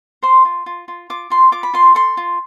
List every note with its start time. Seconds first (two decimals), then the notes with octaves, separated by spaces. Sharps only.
0.23 C5 C6
0.45 F4
0.66 F4
0.88 F4
1.10 F4 D6
1.30 F4 C6
1.52 F4 D6
1.63 B5
1.73 F4 C6
1.95 A4 C6
2.17 F4